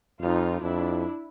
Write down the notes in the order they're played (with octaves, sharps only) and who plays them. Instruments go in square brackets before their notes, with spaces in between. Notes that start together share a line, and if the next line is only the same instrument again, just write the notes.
[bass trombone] F2 [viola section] D#4 F4
[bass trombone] F2 [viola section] D4 E4